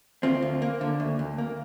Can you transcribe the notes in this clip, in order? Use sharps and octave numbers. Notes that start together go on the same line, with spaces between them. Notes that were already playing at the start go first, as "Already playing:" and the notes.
D2 C4 F4
D2
A#3
D3
D2
D2
A#3